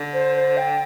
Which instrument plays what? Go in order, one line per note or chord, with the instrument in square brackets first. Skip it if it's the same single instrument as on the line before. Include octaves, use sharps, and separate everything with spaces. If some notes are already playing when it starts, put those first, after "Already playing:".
Already playing: [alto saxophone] D3
[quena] C5
C5
G5